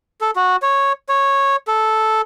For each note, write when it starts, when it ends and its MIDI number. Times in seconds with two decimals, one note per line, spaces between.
0.21 0.31 69
0.36 0.56 66
0.62 0.92 73
1.09 1.56 73
1.68 2.21 69